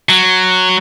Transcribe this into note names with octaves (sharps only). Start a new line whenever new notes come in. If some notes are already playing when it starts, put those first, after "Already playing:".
F#3